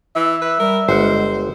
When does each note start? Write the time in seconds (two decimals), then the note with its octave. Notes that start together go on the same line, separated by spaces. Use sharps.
0.16 E3 E5
0.42 B4
0.60 G3 A#4
0.89 G1 G#3 C5 F#5